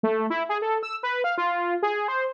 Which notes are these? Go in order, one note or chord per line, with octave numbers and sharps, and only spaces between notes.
A3
E4
G#4
A4
E6
B4
F5
F4
G#4
C5